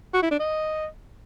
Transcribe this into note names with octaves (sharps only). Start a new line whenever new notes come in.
F#4
E4
D4
D#5